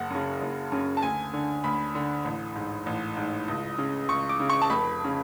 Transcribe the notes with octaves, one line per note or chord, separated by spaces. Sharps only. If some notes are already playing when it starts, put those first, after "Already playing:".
Already playing: F#1 F#5
F#2 C#3
F#1
F#2 C#3
A5
D2 G#5
D3
D2 B5
D3
A1
G#2
A1
G#2
C#2
C#3
C#2 C#6
D6
C#3
C#6
A5
F1 B5
C#3